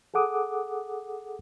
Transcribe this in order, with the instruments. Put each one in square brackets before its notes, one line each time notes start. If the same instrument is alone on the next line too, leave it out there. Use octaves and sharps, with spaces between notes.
[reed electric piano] G#4 A4 F#5 D6 D#6